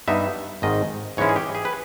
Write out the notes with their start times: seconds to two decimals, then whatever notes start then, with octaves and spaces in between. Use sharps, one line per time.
0.08 G2 G3 B3 D#4 E5
0.62 G#1 G#2 D#3 D#5
1.17 G#2 E3 G#3 C#4 E4 C#5
1.29 G#4
1.36 G4
1.55 G#4
1.65 B4